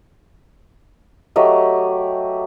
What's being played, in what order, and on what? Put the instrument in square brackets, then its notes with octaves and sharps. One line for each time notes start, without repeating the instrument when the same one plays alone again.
[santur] F#3 A3 G4 D#5